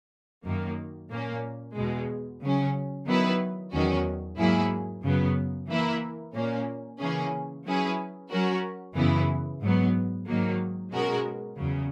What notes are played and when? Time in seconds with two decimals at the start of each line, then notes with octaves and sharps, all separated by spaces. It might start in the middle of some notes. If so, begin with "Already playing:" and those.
0.45 F#2 D#3 A#3
1.11 A#2 A#3 C#4
1.76 E2 B2 G#3
2.42 C#3 F#3 C#4
3.07 D#3 F#3 B3 E4 B4
3.73 E2 D#3 F#3 C#4 F#4
4.38 G#2 F#3 A#3 E4 G#4
5.03 F#2 C#3 F#3 B3
5.68 E3 A#3 E4 A#4
6.34 A#2 A#3 C#4
7.00 C#3 E3 A#3 C#4 G#4
7.65 F#3 C#4 E4 G#4 B4
8.31 F#3 C#4 F#4 A#4
8.96 F#2 C#3 E3 B3 E4
9.62 G#2 F#3 B3
10.27 G#2 D#3 F#3 A#3
10.93 B2 G#3 C#4 F#4 A#4
11.58 E2 C#3 F#3